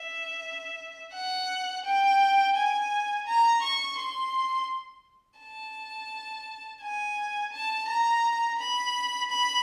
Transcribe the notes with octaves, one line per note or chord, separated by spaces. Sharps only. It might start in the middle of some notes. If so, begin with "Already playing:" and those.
Already playing: E5
F#5
G5
G#5
A#5
C#6
C6
A5
G#5
A5
A#5
B5
B5